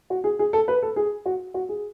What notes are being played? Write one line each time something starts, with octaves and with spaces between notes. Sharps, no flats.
F#4
G#4
G#4
A4
B4
A4
G#4
F#4
F#4
G#4